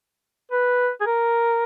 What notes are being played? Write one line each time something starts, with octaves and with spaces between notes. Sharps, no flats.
B4
G#4
A#4